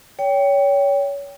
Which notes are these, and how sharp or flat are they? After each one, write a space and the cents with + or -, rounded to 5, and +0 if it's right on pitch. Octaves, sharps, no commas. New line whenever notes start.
C#5 +25 G5 +0